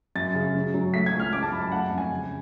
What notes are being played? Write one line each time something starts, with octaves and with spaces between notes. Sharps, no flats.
F#2 A6
C#3
F#3
F#3
A3 B6
G#6
C#2
F6
G#3 D6
A5
F#2 B5
A5
A3 F#5
F2
G#5
C#3